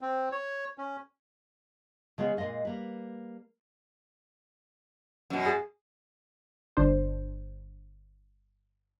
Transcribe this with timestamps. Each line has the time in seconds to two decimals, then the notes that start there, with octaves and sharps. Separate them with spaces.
0.01 C4
0.32 C#5
0.78 C#4
2.18 C#3 G#3 B3 G#4
2.37 A#2 F3 G#3 D#5 F5
2.65 G3 A#3 B4
5.30 F#2 B2
5.46 G#4
6.77 G1 D4 C5